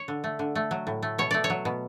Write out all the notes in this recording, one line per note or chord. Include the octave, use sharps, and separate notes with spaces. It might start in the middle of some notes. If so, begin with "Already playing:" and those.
Already playing: C#5
D3
A3
D3
A3
F#3
A2
A3
B2 C#5
A3 D5
C#5
F#3
B2